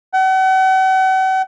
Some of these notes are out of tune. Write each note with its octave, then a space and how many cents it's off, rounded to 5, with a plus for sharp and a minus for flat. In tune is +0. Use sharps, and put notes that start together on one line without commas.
F#5 +40